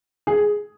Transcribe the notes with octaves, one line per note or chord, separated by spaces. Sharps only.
G#4